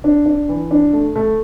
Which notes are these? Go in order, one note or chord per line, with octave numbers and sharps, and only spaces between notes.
D4
D4
E3
D4
A3
A3